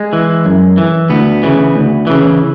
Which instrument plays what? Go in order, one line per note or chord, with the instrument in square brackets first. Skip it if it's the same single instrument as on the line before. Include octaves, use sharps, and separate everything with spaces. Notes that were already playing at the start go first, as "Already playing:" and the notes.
Already playing: [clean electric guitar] G#3
E3
F#2
E3
D2 B3
C#3 E3
D2
C#3 E3